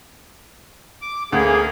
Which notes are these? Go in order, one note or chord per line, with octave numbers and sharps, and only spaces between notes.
D6
D2 A#3 G#4